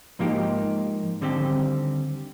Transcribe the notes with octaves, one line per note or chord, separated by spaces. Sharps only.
G#2 F3 A#3 D#4 G4
D#2 D3 G3 C4 G4